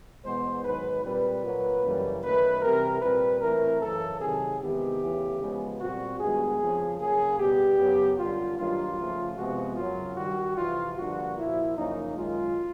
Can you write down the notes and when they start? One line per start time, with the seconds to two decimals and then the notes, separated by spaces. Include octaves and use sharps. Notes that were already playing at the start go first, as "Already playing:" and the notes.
0.24 E2 B2 G#3 B3 C5
0.64 G#2 D#3 F#3 B4
1.04 A#2 G3 C4 B4
1.43 A#2 F#3 A#3
1.83 F#2 C#3 E3 G3 A#3
2.23 F#2 D#3 F#3 A3 B4
2.62 C3 E3 G3 C4 A#4
3.02 A#2 G3 C4 B4
3.41 A2 E3 A3 C4 A#4
3.82 F#2 C#3 E3 A4
4.21 C3 D#3 F#3 G#4
4.61 E2 C3 D#3 G#3 B3 G4
5.01 E2 C#3 E3 A3
5.41 C#3 F3 G#3 B3
5.80 A#2 G3 C4 F#4
6.20 G2 D#3 G#3 B3 G#4
6.59 F2 C#3 F3
6.99 C#3 F#3 A#3 G#4
7.39 B2 G3 B3 G4
7.78 F#2 C#3 F#3 B3
8.18 F#2 D3 G3 F4
8.58 G2 D#3 F#3 A#3 F4
8.98 C#3 F3 A3
9.37 C3 F3 G#3 B3 F#4
9.77 F#2 C#3 F#3 F4
10.16 G2 D#3 G3 F#4
10.57 F2 C3 E3 F4
10.97 G2 D3 F3 A#3 F#4
11.36 A#2 F3 A#3 E4
11.76 F#2 C#3 F3 A#3 D#4
12.16 F#2 D#3 G#3 F4